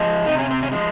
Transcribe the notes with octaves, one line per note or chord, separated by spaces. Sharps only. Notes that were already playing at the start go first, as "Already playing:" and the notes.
Already playing: F3 G#3
C3 D#4
C#4
C4
C#4
F3 G#3